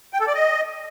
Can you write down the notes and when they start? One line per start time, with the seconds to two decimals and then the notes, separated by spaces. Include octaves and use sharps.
0.13 G5
0.20 A4
0.27 D5
0.34 D#5